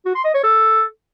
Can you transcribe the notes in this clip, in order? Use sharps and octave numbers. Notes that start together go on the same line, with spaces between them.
F#4
C6
D#5
C#5
A4